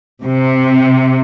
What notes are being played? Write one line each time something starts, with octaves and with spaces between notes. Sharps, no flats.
C3